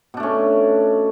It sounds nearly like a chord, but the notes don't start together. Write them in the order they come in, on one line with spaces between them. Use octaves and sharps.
B2 D4 A3 C#4